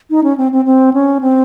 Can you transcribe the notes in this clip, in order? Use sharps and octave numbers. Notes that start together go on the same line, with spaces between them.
D#4
C#4
C4
C4
C4
C#4
C4